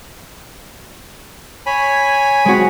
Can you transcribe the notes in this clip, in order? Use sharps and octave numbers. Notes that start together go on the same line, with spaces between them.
C#5 G#5 B5
G#3 C4 F#4